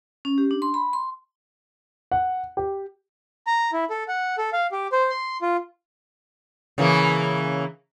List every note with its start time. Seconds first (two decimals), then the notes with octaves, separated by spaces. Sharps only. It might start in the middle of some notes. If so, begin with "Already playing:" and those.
0.25 C#4
0.38 G4
0.51 D4
0.62 C6
0.74 B5
0.93 C6
2.12 F#5
2.57 G4
3.47 A#5
3.73 E4
3.90 A4
4.08 F#5
4.38 A4
4.53 F5
4.72 G4
4.92 C5
5.10 C6
5.42 F4
6.78 C#3 E3 A#3